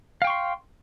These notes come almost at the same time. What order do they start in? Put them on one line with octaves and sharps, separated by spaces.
F5 G5 C#6 C6